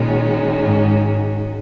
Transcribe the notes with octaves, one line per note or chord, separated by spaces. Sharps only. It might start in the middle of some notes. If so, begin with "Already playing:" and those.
Already playing: A#2 D#3 G#3 C#4 F#4
G#2